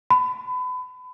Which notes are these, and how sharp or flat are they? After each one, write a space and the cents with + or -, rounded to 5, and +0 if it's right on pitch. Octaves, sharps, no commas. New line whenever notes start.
B5 +30